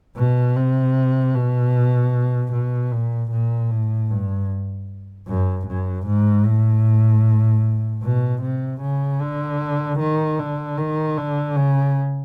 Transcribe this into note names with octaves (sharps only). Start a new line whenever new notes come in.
B2
C3
B2
B2
A#2
A#2
A2
G2
F#2
F#2
G#2
A2
B2
C3
C#3
D3
D#3
D3
D#3
D3
C#3